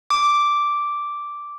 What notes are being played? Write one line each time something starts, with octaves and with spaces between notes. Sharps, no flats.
D6